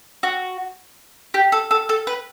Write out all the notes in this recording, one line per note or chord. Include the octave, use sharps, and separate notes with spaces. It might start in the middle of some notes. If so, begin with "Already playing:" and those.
F#4
G4
A4
A4
A4
B4